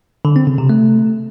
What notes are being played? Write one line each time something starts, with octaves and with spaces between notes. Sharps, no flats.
D3
C4
C#3
C3
A3